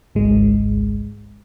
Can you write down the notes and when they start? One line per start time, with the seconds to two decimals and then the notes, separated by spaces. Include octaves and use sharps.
0.15 G#1 C#2 G#2 G#3